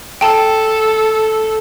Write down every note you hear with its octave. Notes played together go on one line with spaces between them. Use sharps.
A4 G5 A5